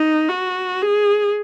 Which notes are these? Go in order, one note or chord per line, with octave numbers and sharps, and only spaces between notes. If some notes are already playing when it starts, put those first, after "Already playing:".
Already playing: D#4
F#4
G#4